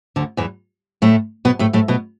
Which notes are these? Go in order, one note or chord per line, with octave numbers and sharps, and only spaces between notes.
D2 D3
E2 E3
A2 A3
B2 B3
A2 A3
A2 A3
B2 B3